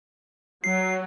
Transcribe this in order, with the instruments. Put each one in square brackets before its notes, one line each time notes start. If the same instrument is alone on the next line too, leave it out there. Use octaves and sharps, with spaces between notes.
[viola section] F#3 [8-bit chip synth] C7